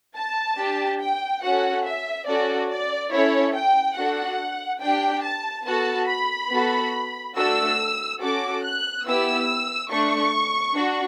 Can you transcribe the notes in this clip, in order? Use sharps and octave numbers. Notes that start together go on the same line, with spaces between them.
A5
D4 G4
G5
C#4 F#4 A4 F#5
E5
C#4 F#4 A4 D5
D5
C#4 E4 A4 C#5
G5
D4 F#4 A4 F#5
D4 G4 G5
A5
B3 F#4 A4 A5
B5
B3 F#4 A4
A3 D4 F#4 A4 E6
C#4 F#4 A4 D6
F#6
B3 E4 G4 E6
A3 D4 A4 C#6
D4 F#4